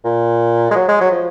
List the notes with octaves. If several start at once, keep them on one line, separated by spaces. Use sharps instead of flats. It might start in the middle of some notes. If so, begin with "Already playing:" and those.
A#2
G#3
F#3
G#3
F#3
F3